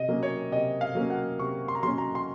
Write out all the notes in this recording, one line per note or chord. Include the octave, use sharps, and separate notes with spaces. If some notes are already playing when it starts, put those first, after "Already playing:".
Already playing: C3 D#5
F#3 A#3 C#4
C#5
C3 D#5
F5
F#3 A#3 C#4
F#5
C3 C#6
C6
A#5
F#3 A#3 C#4 C6
A#5
C6